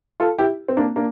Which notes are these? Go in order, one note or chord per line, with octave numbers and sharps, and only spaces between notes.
F4 A4
E4 G4
C4
A#3 D4
A#3 D4